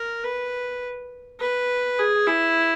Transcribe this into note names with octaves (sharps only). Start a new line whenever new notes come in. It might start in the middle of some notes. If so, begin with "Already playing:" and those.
Already playing: A#4
B4
B4
G#4
E4